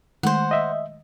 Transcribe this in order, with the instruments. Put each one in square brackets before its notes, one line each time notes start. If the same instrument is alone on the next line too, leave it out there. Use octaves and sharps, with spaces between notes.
[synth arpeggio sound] D#3 G#3 A3 [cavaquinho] C5 F#5
[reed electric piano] D#5 E5